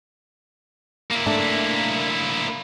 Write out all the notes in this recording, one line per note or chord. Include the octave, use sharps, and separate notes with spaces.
A#3 E4
A3 D4